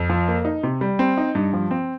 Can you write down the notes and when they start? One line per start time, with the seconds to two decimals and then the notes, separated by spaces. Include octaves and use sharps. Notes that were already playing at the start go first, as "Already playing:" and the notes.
Already playing: F2
0.10 F3
0.28 A#3
0.45 D#4
0.63 C3
0.81 G3
0.99 C4
1.18 D#4
1.35 G2
1.53 F3
1.71 C4